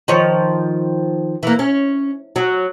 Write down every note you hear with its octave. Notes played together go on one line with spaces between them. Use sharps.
D#3 F3 C#5
E3 A#3
C#4
F#3